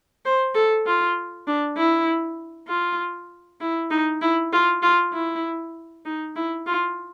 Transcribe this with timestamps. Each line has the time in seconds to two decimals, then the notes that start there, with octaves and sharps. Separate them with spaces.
0.25 C5
0.55 A4
0.86 F4
1.47 D4
1.77 E4
2.68 F4
3.60 E4
3.91 D#4
4.21 E4
4.52 F4
4.82 F4
5.13 E4
6.05 D#4
6.36 E4
6.67 F4